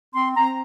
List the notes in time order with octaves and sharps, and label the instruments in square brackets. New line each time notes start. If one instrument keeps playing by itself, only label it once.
[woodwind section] C4 C6
C4 A#5